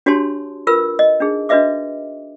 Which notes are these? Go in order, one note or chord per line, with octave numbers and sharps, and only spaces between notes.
D4 F#4 G4 C#5 A5 C6
F4 A#4 B4 E6
D#5
D4 D#4 G#4
D4 F#4 B4 D#5 E5 D6